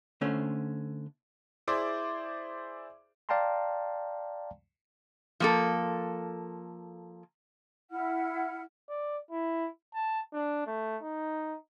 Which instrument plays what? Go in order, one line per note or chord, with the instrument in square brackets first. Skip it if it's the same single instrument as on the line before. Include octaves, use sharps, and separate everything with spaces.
[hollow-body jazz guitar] D3 A3 C#4 C5
[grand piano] E4 G#4 C5 D5 D6
[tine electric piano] D5 F5 G5 A5 A#5 C6
[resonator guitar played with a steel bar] F3 A#3 A4
[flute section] E4 F#5 F6
[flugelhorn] D5
E4
A5
D4
A3
D#4